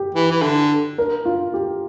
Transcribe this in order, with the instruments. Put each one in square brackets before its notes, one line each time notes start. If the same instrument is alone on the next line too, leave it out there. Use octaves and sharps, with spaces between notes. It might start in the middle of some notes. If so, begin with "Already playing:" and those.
Already playing: [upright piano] G4
[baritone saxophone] E3
E3
D3
[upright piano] A#4
F4
G4